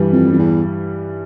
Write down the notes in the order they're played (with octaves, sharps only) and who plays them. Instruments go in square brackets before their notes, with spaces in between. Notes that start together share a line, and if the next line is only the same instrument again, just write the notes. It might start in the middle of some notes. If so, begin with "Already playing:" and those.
Already playing: [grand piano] G2 E3 G3
[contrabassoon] F2
F2
E2